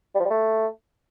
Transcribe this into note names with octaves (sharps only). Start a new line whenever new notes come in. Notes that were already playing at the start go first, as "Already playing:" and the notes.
G3
F3
G3
A3